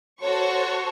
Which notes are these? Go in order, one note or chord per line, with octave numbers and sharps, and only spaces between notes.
F#4 A4 C5 C#5 C#6